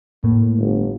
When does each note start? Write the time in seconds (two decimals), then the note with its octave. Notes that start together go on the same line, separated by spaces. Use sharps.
0.24 A2 A#3
0.57 G1